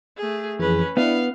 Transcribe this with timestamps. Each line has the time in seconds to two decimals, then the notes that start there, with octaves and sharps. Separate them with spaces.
0.17 A3 G#4
0.59 F2 E3 C#4 G#4 B4
0.97 B3 D4 E4 F5